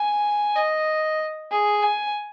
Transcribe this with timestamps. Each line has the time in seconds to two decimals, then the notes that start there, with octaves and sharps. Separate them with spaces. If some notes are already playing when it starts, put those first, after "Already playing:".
Already playing: G#5
0.56 D#5
1.51 G#4
1.83 G#5